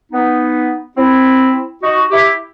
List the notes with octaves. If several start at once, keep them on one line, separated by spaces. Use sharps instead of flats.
B3 D#4
C4 E4
D#4 F#4
E4 G4